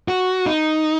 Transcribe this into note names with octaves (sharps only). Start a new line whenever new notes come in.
F#4
D#4